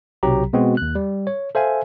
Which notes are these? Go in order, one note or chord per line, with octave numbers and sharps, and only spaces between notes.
B1 C3 F#3 G4 A#5
B2 G#3 B3 C4 F#4
D#2 F#6
G3
C#5
A4 C5 E5 F5 G#5